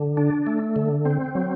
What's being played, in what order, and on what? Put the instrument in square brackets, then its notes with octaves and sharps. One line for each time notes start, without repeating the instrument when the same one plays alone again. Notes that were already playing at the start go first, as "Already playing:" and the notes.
Already playing: [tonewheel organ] D3
D4
A3
D3
C4
F#3